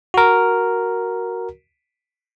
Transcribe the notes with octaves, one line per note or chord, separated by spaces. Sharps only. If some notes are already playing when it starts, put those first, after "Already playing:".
F#4 A#4